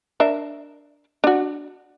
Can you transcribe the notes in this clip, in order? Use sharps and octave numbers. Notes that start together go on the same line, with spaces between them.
D4 A#4 E5
D4 F#4